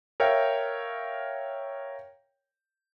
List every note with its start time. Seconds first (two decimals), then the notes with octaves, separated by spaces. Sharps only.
0.20 A#4 C#5 E5 F5 G5